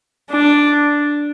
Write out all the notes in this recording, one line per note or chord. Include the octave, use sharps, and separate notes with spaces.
D4